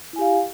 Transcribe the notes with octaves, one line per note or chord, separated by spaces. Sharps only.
E4 G4 F5 G#5